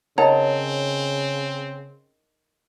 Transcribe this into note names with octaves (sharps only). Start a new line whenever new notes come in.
C#3 C4 D#4 A#4 C#5 D#5 F#5 A#5